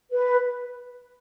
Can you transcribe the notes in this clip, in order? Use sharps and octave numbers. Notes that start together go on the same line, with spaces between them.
B4